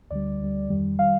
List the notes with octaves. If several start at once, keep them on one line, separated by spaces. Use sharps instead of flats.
D2 D3 G3 D5
D2 D3 G3
F2 D#3 G3
D#3 G3 F5